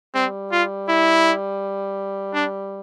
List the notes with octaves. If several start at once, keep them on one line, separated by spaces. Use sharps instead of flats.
G3 C4
F4
E4
D4